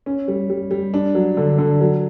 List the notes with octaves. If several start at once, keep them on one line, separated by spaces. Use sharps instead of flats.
C#4
G3
G3
G3
D4
F#3
D3
D3
F#3